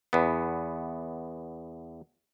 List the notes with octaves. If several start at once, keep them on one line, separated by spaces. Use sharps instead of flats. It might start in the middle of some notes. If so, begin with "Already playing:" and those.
E2 B3